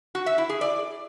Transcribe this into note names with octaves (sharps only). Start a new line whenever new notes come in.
F#4
E5
E4
G#4
D5